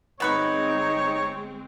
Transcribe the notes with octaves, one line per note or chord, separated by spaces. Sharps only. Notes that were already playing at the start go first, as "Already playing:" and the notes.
G1 B2 G#3 C4 D#4 B4 C#5 C#6